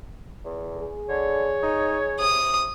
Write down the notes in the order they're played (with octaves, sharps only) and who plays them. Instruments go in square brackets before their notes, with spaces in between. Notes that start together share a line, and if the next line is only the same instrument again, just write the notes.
[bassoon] E2
[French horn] G#4
[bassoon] D3 [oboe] C#5
[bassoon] D#4
[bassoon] C3 [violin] D#6